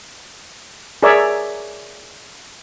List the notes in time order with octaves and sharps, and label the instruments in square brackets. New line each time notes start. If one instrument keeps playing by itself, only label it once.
[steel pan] G#4 A#4 C#5 D5 E5